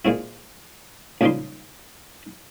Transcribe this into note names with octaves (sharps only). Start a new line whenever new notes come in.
A#2 G#3 C4 E4
C#2 A#2 F3 G3 D#4 C6